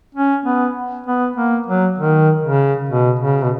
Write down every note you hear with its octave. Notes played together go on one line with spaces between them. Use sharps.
C#4
B3
B3
A#3
F#3
D#3
C#3
B2
C#3
B2